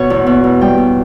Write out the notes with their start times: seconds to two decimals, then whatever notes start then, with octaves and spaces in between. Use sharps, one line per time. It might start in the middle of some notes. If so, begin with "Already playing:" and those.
Already playing: B2 C#5
0.10 E2
0.27 B2
0.44 E2
0.61 G3 G5
0.78 B2